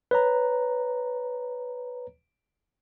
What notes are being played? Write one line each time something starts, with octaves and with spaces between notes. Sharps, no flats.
B4 C#5 A#5